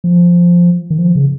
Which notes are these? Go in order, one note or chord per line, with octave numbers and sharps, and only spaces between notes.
F3
D#3
F3
C#3